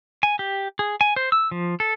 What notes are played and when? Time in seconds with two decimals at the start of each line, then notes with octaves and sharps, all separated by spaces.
0.23 G#5
0.39 G4
0.79 G#4
1.01 G#5
1.16 C5
1.32 E6
1.51 F3
1.80 A4